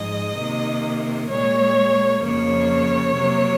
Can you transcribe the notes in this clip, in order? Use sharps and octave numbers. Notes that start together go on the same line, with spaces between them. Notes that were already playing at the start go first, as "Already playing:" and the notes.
Already playing: G#2 F3 G#3 D#5
C3 D#3 A#3
A#2 G#3 C#5
F2 C#3 F3 A#3 C#5
C3 F#3 A#3